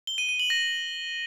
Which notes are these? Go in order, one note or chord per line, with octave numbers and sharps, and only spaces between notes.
G7
D#7
D#7
F#7
A#6